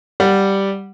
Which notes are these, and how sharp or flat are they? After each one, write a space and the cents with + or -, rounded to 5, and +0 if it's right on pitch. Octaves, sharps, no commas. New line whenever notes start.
G3 +0 F#5 +0